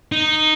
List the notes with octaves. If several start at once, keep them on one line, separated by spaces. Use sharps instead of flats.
D#4